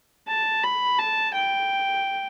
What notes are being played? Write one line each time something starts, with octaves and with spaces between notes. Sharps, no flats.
A5
B5
A5
G5